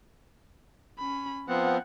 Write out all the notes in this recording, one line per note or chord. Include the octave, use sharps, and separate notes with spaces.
C#4 B5
F3 B3 C4 F#5